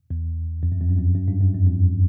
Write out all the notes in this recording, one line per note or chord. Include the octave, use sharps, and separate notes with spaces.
E2
F2
F#2
F2
F#2
F2
F#2
G2
F#2
F2
F2